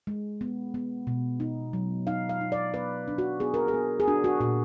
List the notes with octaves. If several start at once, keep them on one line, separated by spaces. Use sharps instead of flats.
G#3
B3
B3
B2
D#4
F#3
D#4 F5
F5
D#4
D5
B3 B4
D4
F#4
B3 G#4
A#4
G#4
B3
G#4
D4 F#4
F#4
A#2 F#4